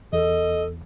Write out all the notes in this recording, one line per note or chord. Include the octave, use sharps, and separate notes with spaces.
E2 A4 D#5